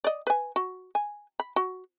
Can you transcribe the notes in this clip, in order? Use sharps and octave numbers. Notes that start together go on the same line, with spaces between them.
D5 D#5
B4 G#5
F#4
G#5
B5
F#4